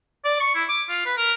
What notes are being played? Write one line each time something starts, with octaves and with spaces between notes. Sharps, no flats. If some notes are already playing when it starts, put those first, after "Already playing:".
D5
C#6
E4
D6
F4
B4
A#4